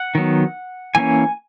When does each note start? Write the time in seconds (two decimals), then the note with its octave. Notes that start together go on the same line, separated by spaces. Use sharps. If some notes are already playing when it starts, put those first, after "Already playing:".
Already playing: F#5
0.15 D#3 F#3 B3
0.95 E3 A#3 C#4 G#5